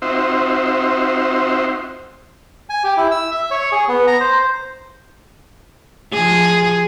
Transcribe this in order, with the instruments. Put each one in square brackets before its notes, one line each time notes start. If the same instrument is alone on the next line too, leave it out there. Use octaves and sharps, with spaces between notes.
[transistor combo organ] C4 D#4 F4 F#4 C5 E5
[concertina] G#5
G4
E4
E6
E5
C#5
G#4
B3
A#5
C5
[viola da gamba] F3 G#4